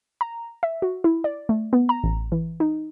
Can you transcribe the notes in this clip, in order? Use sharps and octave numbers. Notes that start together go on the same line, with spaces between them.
A#5
E5
F#4
E4
D5
A3
B3
A#5
A1
E3
D#4